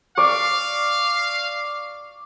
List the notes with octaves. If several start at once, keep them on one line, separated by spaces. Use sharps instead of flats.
D5 F5 C#6